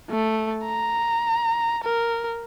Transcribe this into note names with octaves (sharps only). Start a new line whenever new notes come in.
A3
A#5
A#4